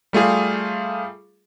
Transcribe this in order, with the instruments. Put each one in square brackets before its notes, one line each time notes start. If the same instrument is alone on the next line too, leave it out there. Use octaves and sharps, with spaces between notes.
[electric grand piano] G3 A3 F4 G#4